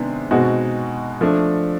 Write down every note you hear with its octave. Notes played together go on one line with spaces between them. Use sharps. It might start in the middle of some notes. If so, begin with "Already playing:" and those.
Already playing: C3 D#3 G#3 B3 D4
B2 G#3 C4 D#4 F#4
F3 A3 D4